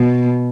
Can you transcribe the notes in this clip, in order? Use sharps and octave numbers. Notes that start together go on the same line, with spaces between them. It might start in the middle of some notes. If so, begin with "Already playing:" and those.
Already playing: B2